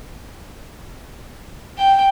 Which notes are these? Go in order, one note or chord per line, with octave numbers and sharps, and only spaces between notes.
G5